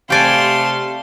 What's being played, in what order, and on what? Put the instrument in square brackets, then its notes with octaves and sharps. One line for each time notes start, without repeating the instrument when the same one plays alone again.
[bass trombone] C3 [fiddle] A3 C6 [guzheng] G4 D5 G#5 [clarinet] F5